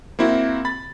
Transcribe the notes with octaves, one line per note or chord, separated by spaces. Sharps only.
A#3 C4 E4 F#4
B5 A6